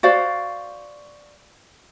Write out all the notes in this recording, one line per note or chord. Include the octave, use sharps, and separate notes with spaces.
F#4 C5 D5 F5